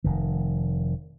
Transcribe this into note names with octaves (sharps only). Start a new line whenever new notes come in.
F1 D#3